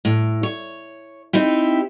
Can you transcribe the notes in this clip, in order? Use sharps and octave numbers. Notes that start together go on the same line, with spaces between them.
A2
C#5
C4 D#4 E4 G4